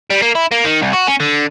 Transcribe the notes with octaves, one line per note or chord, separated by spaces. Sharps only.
G3
A#3
E4
A#3
D#3
C2
F#4
C#4
D3